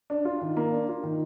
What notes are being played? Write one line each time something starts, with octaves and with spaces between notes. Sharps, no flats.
D4
F4
D#3
A#3
D4
F4
D#3